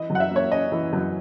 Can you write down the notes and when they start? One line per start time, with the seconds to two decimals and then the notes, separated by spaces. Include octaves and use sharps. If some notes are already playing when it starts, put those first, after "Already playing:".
Already playing: E3 D#5
0.10 F#2
0.15 F#5
0.20 E5
0.31 A#3
0.36 C#5
0.52 C#4 D#5
0.72 E3
0.93 F#2